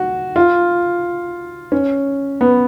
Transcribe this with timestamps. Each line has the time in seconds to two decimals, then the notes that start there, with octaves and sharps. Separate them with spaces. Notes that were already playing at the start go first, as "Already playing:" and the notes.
Already playing: F#4
0.36 F4
1.72 C#4
2.41 B3